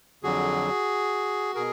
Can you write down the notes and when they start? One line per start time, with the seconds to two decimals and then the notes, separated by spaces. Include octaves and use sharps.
0.23 F2 D3 F#3 F#4 G#4
1.55 B2 G#4 A#4